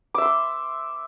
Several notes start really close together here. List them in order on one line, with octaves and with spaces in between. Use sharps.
D6 E5 C6 E6